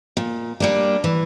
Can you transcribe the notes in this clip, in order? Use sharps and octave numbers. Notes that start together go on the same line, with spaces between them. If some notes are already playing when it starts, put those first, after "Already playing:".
A#2
G3 A#3 D4
E3